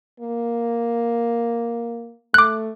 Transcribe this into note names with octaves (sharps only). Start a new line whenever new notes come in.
A#3
A3 D6 F#6